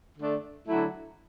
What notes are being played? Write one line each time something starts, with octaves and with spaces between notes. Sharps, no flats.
D3 A3 D4
D3 F#3 A3 E4